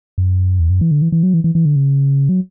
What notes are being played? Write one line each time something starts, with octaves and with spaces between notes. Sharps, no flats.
F#2
E2
F#2
E3
D3
E3
E3
F#3
E3
E3
E3
D3
C#3
F#3